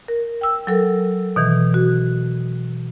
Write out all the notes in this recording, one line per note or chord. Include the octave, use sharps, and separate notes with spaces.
A#4
G5 E6
F#3 A4 A#4
B2 D#3 E3
F#4